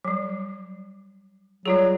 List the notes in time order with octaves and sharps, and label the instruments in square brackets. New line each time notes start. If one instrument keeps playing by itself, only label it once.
[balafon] F#3 G3
[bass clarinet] F#3 [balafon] G3 F4 G#4